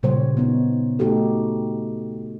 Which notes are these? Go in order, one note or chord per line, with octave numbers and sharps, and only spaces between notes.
A#2 C#3 G3 G#3 C5 C#5
B3 D#4
A3 D#4 F#4 G4 A4